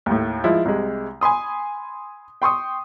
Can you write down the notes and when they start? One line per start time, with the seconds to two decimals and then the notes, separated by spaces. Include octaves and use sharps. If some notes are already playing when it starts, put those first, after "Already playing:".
0.06 D#2 A2
0.44 F3 G#3 E4 F4
0.65 C2 C3 G#3
1.21 G#5 B5 C6 D#6
2.42 G5 C6 C#6 D#6